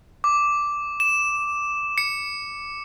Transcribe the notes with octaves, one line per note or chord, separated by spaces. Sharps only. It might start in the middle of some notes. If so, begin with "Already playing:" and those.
D6
E7
C#7